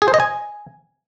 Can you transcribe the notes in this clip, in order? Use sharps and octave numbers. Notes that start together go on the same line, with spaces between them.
G#4
C5
D#5
G#5